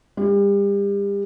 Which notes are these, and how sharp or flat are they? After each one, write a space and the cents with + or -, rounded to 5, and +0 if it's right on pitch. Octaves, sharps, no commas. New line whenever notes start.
G3 +35